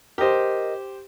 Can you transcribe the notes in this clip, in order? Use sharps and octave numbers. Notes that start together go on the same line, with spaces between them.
G4 A#4 C5 D#5